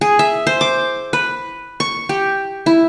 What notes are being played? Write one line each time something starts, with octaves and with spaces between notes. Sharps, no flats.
G#4
E5
C5
D6
B4
C#6
G4
E4